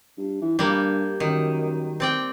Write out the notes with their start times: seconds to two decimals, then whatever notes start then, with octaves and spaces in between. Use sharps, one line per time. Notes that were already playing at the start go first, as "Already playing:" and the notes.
0.18 G2
0.41 E3
0.59 G2 G3 A#3
1.20 F#2 D#3
2.00 C4 D5 G5